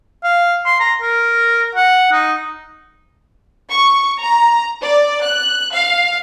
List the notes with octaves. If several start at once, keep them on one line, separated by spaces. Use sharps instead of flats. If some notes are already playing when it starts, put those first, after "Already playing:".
F5
C6
A#5
A#4
F#5
D#4
C#6
A#5
D5
F#6
F5